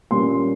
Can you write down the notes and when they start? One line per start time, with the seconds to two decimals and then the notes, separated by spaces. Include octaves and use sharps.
0.11 A#2 G3 A#3 C#4 C6